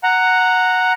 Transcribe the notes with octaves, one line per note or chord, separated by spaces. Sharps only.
F#5 A#5